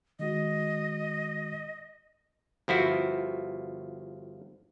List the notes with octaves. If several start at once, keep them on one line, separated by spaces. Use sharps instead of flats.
D#3 G#3 F#4 D#5
G1 F3 E4 F#4